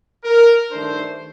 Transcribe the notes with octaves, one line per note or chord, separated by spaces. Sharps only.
A#4
G2 D#3 A3 D4 C5